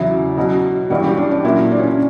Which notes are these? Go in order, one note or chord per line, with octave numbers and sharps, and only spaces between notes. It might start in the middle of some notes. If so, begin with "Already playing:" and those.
Already playing: E2 C#3 F#3 E4
B2 F#3
G2 E3 G3 F#4
G4
D4
D4
A#2 F#3 E4
D4
C#4
D4